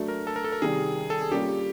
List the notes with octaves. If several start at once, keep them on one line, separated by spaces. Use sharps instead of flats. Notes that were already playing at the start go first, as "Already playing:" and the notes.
Already playing: F#3 A3 D4
A#4
A4
A#4
A4
A#4
C3 D#3 G3 G#4
A4
G#4
G3 A#3 C#4 F4 G4